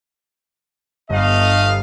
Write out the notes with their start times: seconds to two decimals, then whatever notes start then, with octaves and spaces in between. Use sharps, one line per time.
1.10 G1 A3 D#5 F5